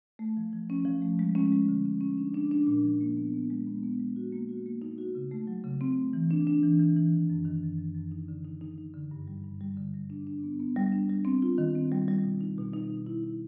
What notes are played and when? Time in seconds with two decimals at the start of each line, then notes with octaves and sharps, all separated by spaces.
0.19 A3
0.37 F3
0.53 F3
0.70 C#4
0.85 F3
1.02 A3
1.19 G#3
1.35 C#4
1.52 G#3
1.69 D3
1.85 C#4
2.01 C#4
2.18 D4
2.34 D4
2.51 D4
2.67 A#2
2.84 F3
3.01 A#3
3.17 B3
3.34 B3
3.50 G#3
3.67 B3
3.83 B3
4.00 G#3
4.16 F#4
4.32 A#3
4.49 F#4
4.66 A#3
4.82 D#4
4.98 F#4
5.15 C#3
5.31 A3
5.47 F#3
5.64 C#3
5.81 C4
5.97 A3
6.13 E3
6.31 D4
6.47 D4
6.63 E3
6.79 E3
6.96 E3
7.12 D#3
7.30 F#2
7.45 D#3
7.63 F#2
7.78 F#2
7.95 F#2
8.12 D#4
8.28 D3
8.44 D#4
8.61 D#4
8.78 D#4
8.94 D3
9.11 G2
9.28 G3
9.44 G2
9.61 G3
9.77 D3
9.94 G3
10.10 D4
10.27 D4
10.43 B3
10.60 B3
10.76 G3
10.92 D4
11.09 G3
11.25 C4
11.42 F4
11.58 D#3
11.75 C4
11.92 G3
12.08 G3
12.24 B2
12.41 D#4
12.58 B2
12.74 D#4
12.90 D#4
13.07 E4
13.23 E4